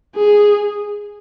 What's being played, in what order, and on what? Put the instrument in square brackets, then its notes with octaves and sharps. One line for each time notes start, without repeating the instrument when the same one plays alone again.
[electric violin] G#4